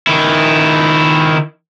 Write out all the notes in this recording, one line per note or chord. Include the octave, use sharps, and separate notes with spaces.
D#3 E4